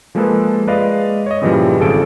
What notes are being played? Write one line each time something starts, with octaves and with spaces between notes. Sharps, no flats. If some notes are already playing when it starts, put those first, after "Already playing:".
F3 G#3 A#3 G#4 A4 B4
G#3 B4 D5 D#5 F5
C#5 D#5
G2 A#2 C#3 E3 F3 G3
G#1 C#3 C#4 A4 D7